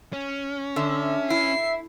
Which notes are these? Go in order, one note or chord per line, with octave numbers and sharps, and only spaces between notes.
C#4
D3 E5
E4 C7